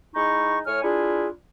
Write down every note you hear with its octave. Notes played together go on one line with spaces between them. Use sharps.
G#3 D#4 E4 C#6
A2 C#5 G#5 F6
D4 E4 F4 G#4